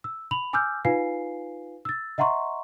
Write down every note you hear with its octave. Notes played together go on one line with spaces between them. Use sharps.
E6
B5 F7 F#7
G#5 D6 E6 F6 G6
D#4 F4 B4 F5 G#5 C7
E6 A6
D#5 E5 F#5 A#5 C6 C#6